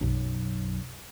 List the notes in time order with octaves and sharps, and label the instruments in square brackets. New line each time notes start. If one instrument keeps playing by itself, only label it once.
[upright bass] B1 F#2